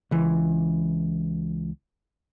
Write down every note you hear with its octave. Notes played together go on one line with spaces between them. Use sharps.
C#2 E3